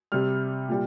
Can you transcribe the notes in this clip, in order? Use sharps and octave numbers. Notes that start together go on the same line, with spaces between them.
C3 G3 F6
A#2 G3